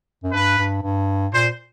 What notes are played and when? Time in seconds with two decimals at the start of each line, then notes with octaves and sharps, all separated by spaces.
0.23 F#2
0.33 G2 B4
0.58 G2
0.82 G2
1.32 A#2 C5